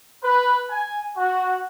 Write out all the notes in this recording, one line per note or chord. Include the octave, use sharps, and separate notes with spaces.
B4
G#5
F#4